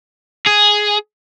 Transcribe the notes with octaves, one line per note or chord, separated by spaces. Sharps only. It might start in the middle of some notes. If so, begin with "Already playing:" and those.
G#4